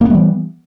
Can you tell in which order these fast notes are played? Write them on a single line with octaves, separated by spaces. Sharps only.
A#3 B3 G3 E3